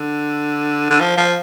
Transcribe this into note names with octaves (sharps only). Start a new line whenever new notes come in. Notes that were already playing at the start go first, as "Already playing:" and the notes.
Already playing: D3
D3
F3
F3